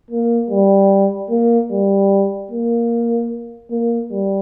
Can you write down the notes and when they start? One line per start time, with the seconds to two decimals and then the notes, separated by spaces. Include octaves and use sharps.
0.11 A#3
0.50 G3
1.30 A#3
1.71 G3
2.51 A#3
3.71 A#3
4.12 G3